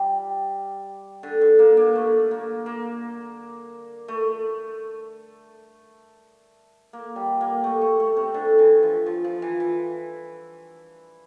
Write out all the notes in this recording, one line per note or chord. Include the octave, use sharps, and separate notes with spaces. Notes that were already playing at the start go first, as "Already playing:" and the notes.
Already playing: G3
D3
D3
A#3
A#3
A3
A#3
A#3
A3
A#3
G3
A#3
A3
A3
A3
C3
D3
E3
F3
F3
F3
E3
E3